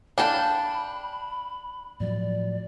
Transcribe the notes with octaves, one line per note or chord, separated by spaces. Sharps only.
D4 F5 G5 A5 B5
A2 F3 F#3 D5